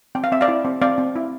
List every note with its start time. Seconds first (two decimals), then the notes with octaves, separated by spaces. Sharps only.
0.15 C4 G5
0.24 F5
0.32 C4 E5
0.41 D5 F5
0.48 E4
0.65 C4
0.81 C4 D5 F5
0.98 C4
1.16 E4